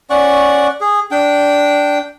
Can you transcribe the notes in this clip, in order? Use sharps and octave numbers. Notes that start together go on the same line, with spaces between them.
C#4 D5 F#5 C#6
G#4
D4 G5